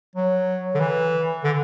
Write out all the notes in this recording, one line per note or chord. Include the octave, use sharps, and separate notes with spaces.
F#3
D3
E3
D3